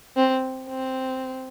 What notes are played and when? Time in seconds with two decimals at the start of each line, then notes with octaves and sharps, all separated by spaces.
0.16 C4
0.69 C4